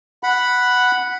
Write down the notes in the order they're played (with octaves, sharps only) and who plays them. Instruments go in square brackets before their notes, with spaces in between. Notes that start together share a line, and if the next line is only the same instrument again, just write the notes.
[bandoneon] F#5 B5